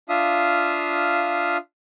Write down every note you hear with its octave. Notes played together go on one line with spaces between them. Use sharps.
D4 F4 E5 F5 D#6